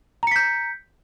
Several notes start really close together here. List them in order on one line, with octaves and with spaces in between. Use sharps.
A#5 C#7 B6 G6